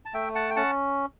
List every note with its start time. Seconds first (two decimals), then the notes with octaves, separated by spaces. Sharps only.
0.05 A5
0.14 A3 E5 G5
0.35 F#5 A5
0.50 G5
0.56 C#4 F#5 A5